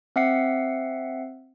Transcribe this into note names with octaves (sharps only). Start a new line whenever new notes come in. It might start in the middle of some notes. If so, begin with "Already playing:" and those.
C4 E5 F#5 C7 C#7